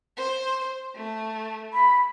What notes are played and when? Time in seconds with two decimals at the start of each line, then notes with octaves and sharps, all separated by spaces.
0.17 C5
0.95 A3
1.73 B5